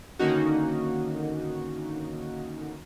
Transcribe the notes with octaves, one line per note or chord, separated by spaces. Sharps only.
D3 D#3 A#3 C#4 D#4 F#4